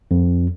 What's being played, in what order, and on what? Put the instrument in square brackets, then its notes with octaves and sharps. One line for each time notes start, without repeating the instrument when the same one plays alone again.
[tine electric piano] F2